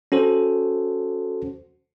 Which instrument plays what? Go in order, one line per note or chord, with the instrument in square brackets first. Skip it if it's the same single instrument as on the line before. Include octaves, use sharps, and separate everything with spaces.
[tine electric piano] C#4 F#4 A4 C5